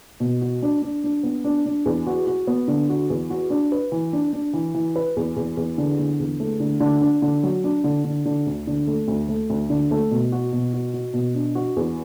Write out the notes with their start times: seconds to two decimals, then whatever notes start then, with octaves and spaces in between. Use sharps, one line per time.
0.20 B2
0.42 F#4
0.62 D4
0.82 D4
1.04 D4
1.23 B3
1.44 D4
1.66 D4
1.86 E2
2.07 F#4
2.27 F#4
2.47 B3
2.68 D3
2.90 F#4
3.10 E2
3.30 F#4
3.50 D4
3.72 B4
3.92 E3
4.13 D4
4.33 D4
4.53 E3
4.74 E3
4.96 B4
5.17 E2
5.36 E2
5.57 E2
5.78 D3
5.99 D3
6.20 E2
6.40 A3
6.60 D3
6.80 D3
7.01 D4
7.22 D3
7.43 F#3
7.64 D4
7.84 D3
8.04 D3
8.25 D3
8.47 D2
8.67 D3
8.87 A3
9.08 D2
9.29 A3
9.50 D2
9.70 D3
9.91 A3
10.11 B2
10.32 F#4
10.53 B2
10.74 F#4
10.94 F#4
11.14 B2
11.35 D4
11.55 F#4
11.76 E2